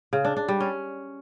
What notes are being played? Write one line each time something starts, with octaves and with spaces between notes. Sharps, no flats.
C#3
D4
D4
G3
C#4